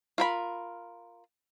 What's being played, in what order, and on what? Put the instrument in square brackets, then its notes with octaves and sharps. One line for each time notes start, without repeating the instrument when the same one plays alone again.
[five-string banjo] F4 A#4 B5